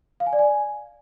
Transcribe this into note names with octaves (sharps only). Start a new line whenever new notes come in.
F5
G#5
D5
G#5